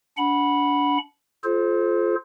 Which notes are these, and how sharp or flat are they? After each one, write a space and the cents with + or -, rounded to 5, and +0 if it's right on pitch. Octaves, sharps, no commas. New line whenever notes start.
D4 -30 F#5 +0 B5 -10
F4 +0 A4 -45 C5 +5